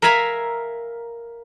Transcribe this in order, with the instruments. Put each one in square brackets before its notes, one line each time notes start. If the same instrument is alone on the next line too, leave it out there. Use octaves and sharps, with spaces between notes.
[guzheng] A#4 E5 F5 G#5 A#5 B5